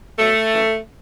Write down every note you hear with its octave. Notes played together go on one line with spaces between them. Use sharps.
B2 F#3 A3
F#2 C#3 E3